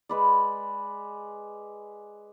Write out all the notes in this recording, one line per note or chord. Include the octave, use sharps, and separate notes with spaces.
G#3 B4 D5